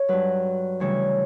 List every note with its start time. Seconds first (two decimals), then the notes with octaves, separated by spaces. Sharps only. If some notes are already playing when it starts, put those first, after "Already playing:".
Already playing: C#5
0.08 G2 F#3 B4
0.80 D2 C#3 E3 G3 C#5